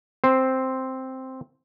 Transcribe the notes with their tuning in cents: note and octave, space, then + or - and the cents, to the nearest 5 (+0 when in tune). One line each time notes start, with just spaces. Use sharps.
C4 +0 C5 +0